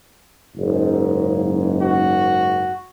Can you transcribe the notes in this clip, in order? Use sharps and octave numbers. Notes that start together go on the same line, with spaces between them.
F#1 G#2
F#4